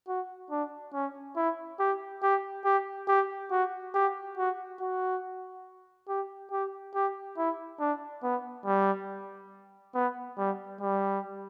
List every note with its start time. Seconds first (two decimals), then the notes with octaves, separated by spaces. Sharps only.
0.08 F#4
0.51 D4
0.94 C#4
1.36 E4
1.80 G4
2.23 G4
2.65 G4
3.08 G4
3.51 F#4
3.94 G4
4.38 F#4
4.80 F#4
6.08 G4
6.51 G4
6.95 G4
7.37 E4
7.80 D4
8.23 B3
8.66 G3
9.95 B3
10.38 G3
10.81 G3